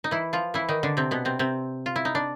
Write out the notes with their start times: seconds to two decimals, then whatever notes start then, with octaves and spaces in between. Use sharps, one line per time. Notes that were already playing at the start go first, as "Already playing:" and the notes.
0.04 D#4
0.11 E3 E4
0.33 F3 F4
0.54 E3 E4
0.69 D#3 D#4
0.83 D3 D4
0.97 C3 C4
1.11 B2 B3
1.25 C3 C4
1.39 C3 C4
1.86 F4
1.96 E4
2.05 D#4
2.15 D4